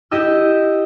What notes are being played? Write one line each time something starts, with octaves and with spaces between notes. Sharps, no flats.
E4 G4 D#5 G5 E6